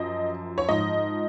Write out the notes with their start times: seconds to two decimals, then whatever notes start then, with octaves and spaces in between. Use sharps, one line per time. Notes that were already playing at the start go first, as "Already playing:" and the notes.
Already playing: F#2 F3 D#5
0.58 C#5
0.68 G#2 F3 D#5